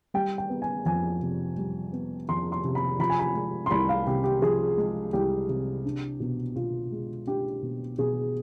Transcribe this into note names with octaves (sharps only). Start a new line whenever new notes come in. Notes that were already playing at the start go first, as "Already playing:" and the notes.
G3 G5
G5
B3
G#5
F2 G#5
C3
G3
B3
F2 C6
C6
C3
B5
F3 B5
G#5
B5
G#3
C6
C2 B5
F5
C3 G4
G4
F3 G#4
G#3
C2 G4
C3
D4
B2
B2 F4
G#3
D4 G4
B2
B2 G#4